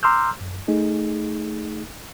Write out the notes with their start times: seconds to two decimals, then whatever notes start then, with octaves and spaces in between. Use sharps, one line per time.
0.03 A#5 C6 D6 E6 F6 G6
0.41 F#2
0.68 A3 D#4 G#4